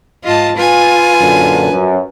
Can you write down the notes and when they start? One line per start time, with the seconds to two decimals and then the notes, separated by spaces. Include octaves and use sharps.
0.24 G#2 F4 D#5 A5
0.56 F4 B4 G#5
1.20 F#2 A#2 D3
1.73 F#2